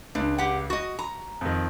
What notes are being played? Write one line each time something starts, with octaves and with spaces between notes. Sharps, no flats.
C#2 D4
G4 F#5
F#4 D#5 C#6
A#5
F2 D#3